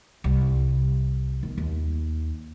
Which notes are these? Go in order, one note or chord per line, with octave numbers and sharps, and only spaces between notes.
C2
D#3 B3
D#2